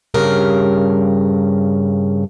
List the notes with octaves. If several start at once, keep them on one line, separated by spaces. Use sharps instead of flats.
G2 C#3 A#4